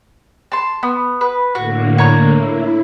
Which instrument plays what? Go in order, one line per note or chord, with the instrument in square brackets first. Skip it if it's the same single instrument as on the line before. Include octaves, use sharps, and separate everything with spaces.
[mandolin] A5 C6
B3
B4
[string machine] A2 D3 A#3 [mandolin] F#4
[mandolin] C#5 A#5 C#6
[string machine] E4